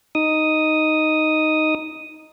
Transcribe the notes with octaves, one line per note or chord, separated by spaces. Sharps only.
D#4 D#6